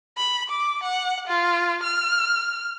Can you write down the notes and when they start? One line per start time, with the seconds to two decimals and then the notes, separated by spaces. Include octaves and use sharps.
0.17 B5
0.50 D6
0.83 F#5
1.27 F4
1.83 F6